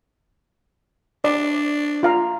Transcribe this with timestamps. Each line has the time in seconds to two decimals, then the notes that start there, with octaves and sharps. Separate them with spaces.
1.24 D4 D5
2.03 F4 F5 A#5